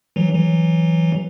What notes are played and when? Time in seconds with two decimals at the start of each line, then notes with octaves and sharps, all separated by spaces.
0.16 E3 F#3
0.34 E3 F#3